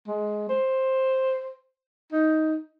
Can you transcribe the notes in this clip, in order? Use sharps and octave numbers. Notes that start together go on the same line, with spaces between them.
G#3
C5
D#4